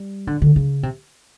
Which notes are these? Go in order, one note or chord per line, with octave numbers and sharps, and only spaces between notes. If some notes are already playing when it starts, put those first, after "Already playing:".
Already playing: G3
D3
D3
C#3
C3